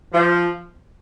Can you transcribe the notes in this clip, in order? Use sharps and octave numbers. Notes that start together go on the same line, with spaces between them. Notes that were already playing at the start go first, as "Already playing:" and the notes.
F3